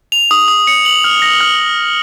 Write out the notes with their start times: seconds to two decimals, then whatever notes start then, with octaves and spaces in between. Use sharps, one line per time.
0.12 F7
0.31 D#6
0.48 D#6
0.67 C#7
0.85 F#7
1.04 F6
1.22 A#6
1.41 F6